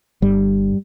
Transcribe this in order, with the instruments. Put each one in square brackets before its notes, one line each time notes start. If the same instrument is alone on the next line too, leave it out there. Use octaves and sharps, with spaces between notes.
[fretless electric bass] G1 G2 G3